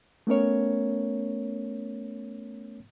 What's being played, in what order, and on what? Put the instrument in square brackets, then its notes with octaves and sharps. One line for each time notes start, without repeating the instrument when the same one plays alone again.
[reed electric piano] A3 B3 C#4 A#4 C#5